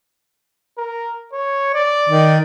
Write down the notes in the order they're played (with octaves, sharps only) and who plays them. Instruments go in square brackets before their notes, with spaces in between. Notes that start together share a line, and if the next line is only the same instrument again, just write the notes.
[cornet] A#4
C#5
D5
[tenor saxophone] D#3